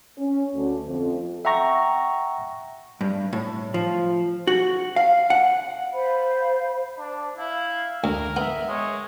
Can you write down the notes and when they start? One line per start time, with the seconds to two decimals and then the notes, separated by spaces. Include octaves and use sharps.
0.18 C#4
0.56 D2
0.88 F2
1.45 E5 F#5 G5 A#5 C#6 A#6
3.01 G2
3.33 A2
3.74 F3
4.47 F#4
4.96 F5
5.30 F#5
5.93 C5 F5 B5
6.97 D4
7.38 E4 F5
8.04 D2 A#4
8.36 B3 E5
8.68 G#3 C#5